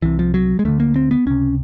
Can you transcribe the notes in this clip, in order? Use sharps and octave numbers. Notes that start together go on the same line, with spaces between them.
C2 C3 E3
F3
F#3
G#3
D2 D3 A3
A#3
C4
B3
C#2 C3 C#4